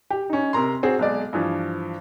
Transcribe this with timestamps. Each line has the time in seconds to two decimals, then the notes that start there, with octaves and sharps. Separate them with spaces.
0.10 G4
0.30 C#4 D#4
0.53 C3 A#4 A#5 C6
0.83 C4 F#4 G#4
0.99 B1 G#3 D5
1.33 G2 E3 F3